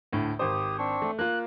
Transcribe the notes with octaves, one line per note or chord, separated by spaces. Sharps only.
D2 A2
G#1 G4 C5 D#6
C4 D4 C#6
A3
A#3 F4 F#6